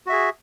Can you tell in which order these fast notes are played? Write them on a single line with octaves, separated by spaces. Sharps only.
F#4 E5 G#4